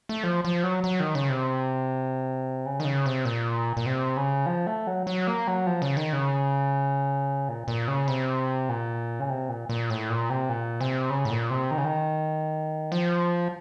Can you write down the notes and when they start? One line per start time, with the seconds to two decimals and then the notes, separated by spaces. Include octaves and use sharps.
0.09 A3
0.23 F3
0.45 F3
0.64 F#3
0.84 F#3
1.00 D#3
1.15 C#3
1.30 C3
2.66 C#3
2.80 D#3
2.85 C#3
3.06 C3
3.25 A#2
3.77 A#2
3.86 C3
4.17 C#3
4.46 F3
4.67 A3
4.87 F#3
5.07 F#3
5.27 A#3
5.47 F#3
5.67 F3
5.82 C#3
5.97 D#3
6.13 C#3
7.49 A#2
7.68 A#2
7.88 C#3
8.08 C3
8.69 A#2
9.20 C#3
9.30 C3
9.49 A#2
9.69 A#2
9.90 A2
10.10 A#2
10.30 C3
10.49 A#2
10.81 C3
11.10 C#3
11.25 A2
11.31 A#2
11.50 C3
11.71 D#3
11.78 C#3
11.85 D#3
12.92 F3